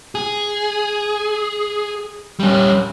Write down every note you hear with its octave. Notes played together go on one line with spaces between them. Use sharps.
G#4
G3 C#4